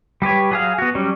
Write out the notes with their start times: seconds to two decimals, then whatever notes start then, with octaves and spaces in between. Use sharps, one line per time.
0.22 G3 G4 B4 C#5
0.51 F#3 G#4 F5
0.78 B3 F#4
0.95 F#3 G3 C#4